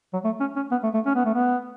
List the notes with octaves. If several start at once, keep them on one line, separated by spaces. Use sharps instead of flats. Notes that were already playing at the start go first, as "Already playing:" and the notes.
F#3
A3
C#4
C#4
B3
A3
A3
C#4
B3
A3
B3